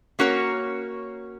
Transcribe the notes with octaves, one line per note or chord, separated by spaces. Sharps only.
A#3 C#4 F#4 A#4 C#5